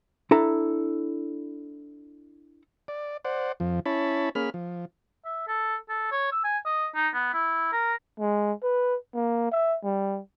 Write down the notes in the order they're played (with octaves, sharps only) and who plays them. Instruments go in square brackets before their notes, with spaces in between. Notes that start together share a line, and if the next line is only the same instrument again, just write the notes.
[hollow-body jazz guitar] D4 E4 A4 A#5
[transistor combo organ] D5
C5 D5 F#5
F2 F3
C#4 E4 C#5 A5 B5
A#3 C#4 G#4 B5 F6
F3
[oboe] E5
A4
A4
C#5
E6
G#5
D#5
D#4
B3
E4
A#4
[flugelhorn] G#3
B4
A#3
E5
G3